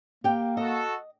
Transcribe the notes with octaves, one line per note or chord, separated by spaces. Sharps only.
A#3 G4 G5
F#4 A4 D#5